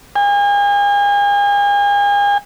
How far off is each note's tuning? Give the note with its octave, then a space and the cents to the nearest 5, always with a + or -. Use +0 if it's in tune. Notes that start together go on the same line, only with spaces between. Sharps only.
G#5 -40